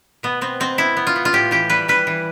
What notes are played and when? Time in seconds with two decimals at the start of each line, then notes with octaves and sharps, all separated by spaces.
0.23 B2 B3
0.41 B3 C4
0.60 B2 C4
0.78 B3 E4
0.97 B3
1.07 F4
1.16 B3
1.25 F4
1.33 A2 G4
1.51 E3 G4
1.70 G3 B4
1.88 G3 B4
2.07 E3